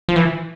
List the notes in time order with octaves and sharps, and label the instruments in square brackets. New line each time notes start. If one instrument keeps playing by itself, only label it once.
[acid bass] F3
E3